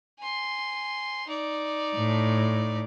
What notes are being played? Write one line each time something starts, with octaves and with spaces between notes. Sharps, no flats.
G#5 C6
D#4 D5
A2